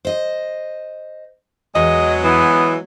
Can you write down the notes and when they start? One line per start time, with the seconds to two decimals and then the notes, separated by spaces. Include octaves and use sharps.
0.05 C5 D#5
1.75 E2 F#3 G#3 D#5
2.24 E3 B3